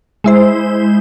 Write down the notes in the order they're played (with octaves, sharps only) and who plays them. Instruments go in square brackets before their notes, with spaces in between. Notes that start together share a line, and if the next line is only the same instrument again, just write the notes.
[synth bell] G#3 E4 C5